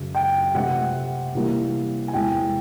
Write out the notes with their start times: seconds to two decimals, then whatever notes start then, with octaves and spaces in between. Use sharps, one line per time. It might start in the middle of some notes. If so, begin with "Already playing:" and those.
Already playing: F#2 C#3 F#3
0.15 G5
0.55 C3 F3 A3 C4 F#5
1.35 C3 E3 G3 A#3
2.08 G#5
2.13 E2 C3 E3 G#3 G5